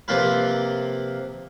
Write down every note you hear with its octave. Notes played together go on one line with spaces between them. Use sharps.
C3 F3 A#3 F4 A#4 B4